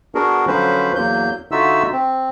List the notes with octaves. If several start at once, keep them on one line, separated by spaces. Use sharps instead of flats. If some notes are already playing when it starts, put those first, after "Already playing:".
B3 D4 F#4 G#4 A#4
D3 F3 F#3 C#4 B4 C5
E2 F#3 A#3 G6
D3 D#4 F4 F#4 E5 E6
C4